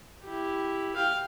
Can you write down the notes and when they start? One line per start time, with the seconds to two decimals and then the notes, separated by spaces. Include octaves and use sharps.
0.24 E4 G4
0.96 F5 G5